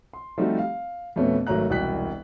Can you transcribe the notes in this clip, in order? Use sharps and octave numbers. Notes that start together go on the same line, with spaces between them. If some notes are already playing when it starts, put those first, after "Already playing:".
C6
F3 G3 A3 C4 D#4 F#4
F5
F2 B2 A3 B3 C#4
G#1 F#3 A3 A#5 F#6
E1 C2 F#4 G5 F#6 B6